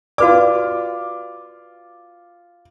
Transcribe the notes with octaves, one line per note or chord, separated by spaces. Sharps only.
F4 F#4 B4 D5 D6